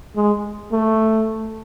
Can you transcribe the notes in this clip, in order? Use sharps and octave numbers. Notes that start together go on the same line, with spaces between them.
G#3
A3